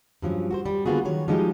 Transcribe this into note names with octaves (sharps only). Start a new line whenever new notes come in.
G2 F3 F#3 C#4
F#4 A4 C5
G3
D3 A#3 B3 F4 F#4 G#4
D#3 F#3 C#5
F3 G3 G#3 D#4 F#4 G4